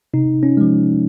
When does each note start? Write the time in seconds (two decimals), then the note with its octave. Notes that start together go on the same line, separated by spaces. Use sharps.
0.14 C3 D#4
0.43 C#4
0.57 F3 G#3